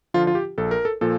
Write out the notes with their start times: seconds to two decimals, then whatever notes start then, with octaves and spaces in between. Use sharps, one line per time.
0.14 D3 F3 F4
0.27 F4
0.35 G4
0.58 A#1 A4
0.71 A#4
0.85 A4
1.01 A#2 F3 A4